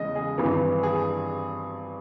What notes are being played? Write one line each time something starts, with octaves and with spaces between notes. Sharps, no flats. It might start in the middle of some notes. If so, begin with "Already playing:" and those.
Already playing: E2 C#3 G#3 D#5
G#4
G#1 G2 E3
G#4